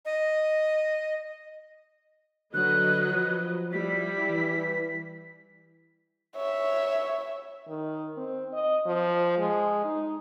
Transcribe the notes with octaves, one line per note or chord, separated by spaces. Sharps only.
D#5
D3 F#3 B4 D#5 F#6
F3
G3 E4 B6
E3
C#5 E5
D#3
C4
D#5
F3
G#3
D#4